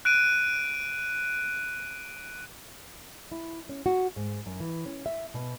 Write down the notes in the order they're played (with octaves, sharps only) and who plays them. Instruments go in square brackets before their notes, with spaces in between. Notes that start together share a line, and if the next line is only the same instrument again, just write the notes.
[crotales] F#6 D7 D#7
[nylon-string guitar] E4
C#4
F#4
G#2
F#2
E3
C#4
E5
B2